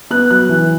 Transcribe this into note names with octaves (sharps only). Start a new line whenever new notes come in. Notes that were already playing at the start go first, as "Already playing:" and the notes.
B3 F#6
F#3 F#6
E3